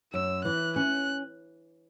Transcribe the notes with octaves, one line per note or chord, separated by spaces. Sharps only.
F#2 E6
E3 F#6
C#4 F#6